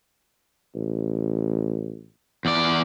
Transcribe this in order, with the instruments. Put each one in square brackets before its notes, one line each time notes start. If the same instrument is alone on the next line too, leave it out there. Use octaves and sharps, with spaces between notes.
[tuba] A1
[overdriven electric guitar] E2 D5